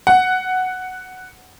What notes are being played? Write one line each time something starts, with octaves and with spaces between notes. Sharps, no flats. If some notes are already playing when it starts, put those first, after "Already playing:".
F#5